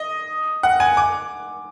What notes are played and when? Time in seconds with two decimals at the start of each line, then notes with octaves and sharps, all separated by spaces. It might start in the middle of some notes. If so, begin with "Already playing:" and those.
Already playing: D#5
0.63 F#5
0.80 G#5
0.97 D6